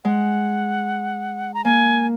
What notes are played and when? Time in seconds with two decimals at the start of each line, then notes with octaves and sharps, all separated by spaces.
0.04 G#3 F#5
1.54 A#5
1.64 A#3 G#5